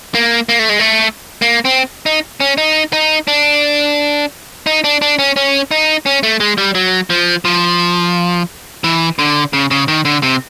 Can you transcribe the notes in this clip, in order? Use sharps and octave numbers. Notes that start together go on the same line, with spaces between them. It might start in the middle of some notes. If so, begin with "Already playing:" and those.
A#3
A#3
A3
G#3
A3
A#3
C4
D#4
C#4
D#4
D#4
D4
D#4
D4
D4
C#4
C#4
D#4
C#4
A3
G#3
G3
F#3
F3
F3
E3
D3
C#3
C#3
D#3
D3
C3